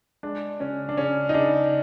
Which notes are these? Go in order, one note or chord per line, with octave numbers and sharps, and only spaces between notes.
G#3 D4
C#3 C#4
D4
C#3 C#4
D#4
C#3 D4